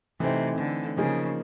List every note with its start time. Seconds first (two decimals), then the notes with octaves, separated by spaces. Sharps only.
0.20 C3 E3 A3 C4 D#4
0.58 D3
0.97 C#3 F3 A#3 D#4 G#4